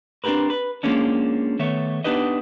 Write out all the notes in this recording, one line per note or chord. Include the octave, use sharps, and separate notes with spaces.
C4 D4 D#4 G4 A#4 B4
B4
F3 G#3 A#3 C#4 D4
D#3 A3 B3 C#5 E5
B3 D4 D#4 G4 B4 D#5